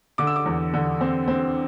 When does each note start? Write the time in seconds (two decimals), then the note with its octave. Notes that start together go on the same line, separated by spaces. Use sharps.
0.18 D3 D6
0.27 E6
0.36 D6
0.46 E2
0.74 D3
1.01 C4
1.28 C4